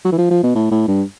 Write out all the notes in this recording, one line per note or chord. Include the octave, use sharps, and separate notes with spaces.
F#3
E3
F3
F3
B2
A2
A2
G2